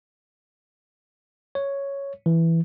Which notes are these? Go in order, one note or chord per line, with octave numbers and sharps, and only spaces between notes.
C#5
E3